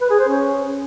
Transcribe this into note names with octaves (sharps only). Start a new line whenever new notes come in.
B4
G#4
C5
C#4